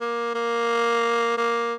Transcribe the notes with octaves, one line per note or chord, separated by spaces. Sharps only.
A#3
A#3
A#3